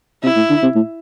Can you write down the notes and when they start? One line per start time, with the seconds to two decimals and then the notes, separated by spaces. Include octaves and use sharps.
0.24 C3 E4
0.36 A2
0.50 D3
0.63 C3
0.76 A2